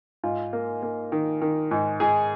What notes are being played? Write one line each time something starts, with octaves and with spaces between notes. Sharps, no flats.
G#2 F4
A#3
A#3
D#3
D#3
G#2
G#2 G#4